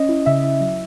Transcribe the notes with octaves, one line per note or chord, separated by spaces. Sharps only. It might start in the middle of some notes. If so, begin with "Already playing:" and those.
Already playing: C#4 D#5
E4
C#3 E5
E4
F#3